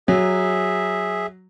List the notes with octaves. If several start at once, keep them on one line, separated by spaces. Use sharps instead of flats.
F#3 G#4 E5